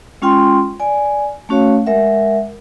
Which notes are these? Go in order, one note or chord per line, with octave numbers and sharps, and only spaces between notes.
G#3 C#4 F4 G5 C6
D5 G#5
A3 C#4 F#4 C#5 F5
G#3 A#4 E5 F#5